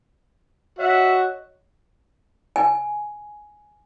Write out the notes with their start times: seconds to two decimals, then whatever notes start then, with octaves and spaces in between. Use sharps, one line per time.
0.79 F#4 C#5 D#5 E5
2.56 G#5